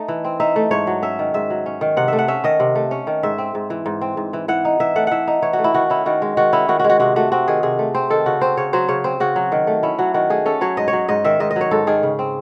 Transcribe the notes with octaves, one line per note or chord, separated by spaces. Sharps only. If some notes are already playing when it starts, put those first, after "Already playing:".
Already playing: A3 D#4 D#5
E3
C4
D#4 E5
A3
G#2 C#5
F#3
C#4 E5
D#3
G#2 E5
F#3
C#4
D#3
C3 F#5
A3 E5
F#5
C#4 E5
D#3 D#5
C3
A3
C#4
D#3
G#2 E5
C4
G#2
E3
G#2
C4
G#2
E3
E3 F#5
D#4
E3 E5
A3 F#5
E3 E5 F#5
D#4
E3 C#5
F#4
A3
E4
D#3 F#4
C#4 E4
D#3 F#4
G#3
D#3 F#4
C#4 E4
D#3 F#4
F#4
G#3
F#4
C3 F#4
A3 F#4
C4 F#4
D#3 G#4
C3 G#4
A3
C4 C5
D#3 A4
C#3 F#4
C4 C5
C#3 C#5
F#3 C5
C#3 C#5
C4 C5
C#3 F#4
F#3
D#3
A3
C#4 E4
F#3 F#4
D#3 F#4
A3 G#4
C#4 A4
F#3 C#5
G#2 D#5
C#5
F#3
G#2 D#5
D#3 E5
G#2 D#5
D#5
F#3
C#5
G#2 A4
D#3 G#4
C#3
C4